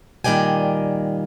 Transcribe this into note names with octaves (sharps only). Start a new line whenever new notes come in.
A#2 D#3 G3 D5 G5 G#5